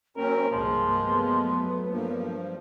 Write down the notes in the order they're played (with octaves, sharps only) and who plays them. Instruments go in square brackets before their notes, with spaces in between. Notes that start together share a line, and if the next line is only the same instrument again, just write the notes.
[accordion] F#2 C4 C#4 [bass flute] A#3 [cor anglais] A#4
[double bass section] C2 G2 [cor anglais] F3 [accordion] G#3
[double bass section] F#3 A3 B3
[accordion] G2 F3 [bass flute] A#3